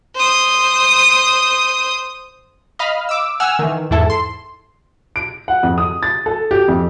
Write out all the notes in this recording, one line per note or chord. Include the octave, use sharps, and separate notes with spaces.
C5 D#6
D#5 F5 B5 F6
D6 E6
F#5 G#5 E6 F6
D#3 E3
E2 G#2 E4 A4 A5
C6
D7
F#5
F2
D#6
A6
A4
G4
F2